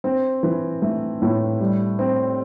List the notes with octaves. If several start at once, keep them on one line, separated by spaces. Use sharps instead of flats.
C4
E3
A3
A2
G3
C4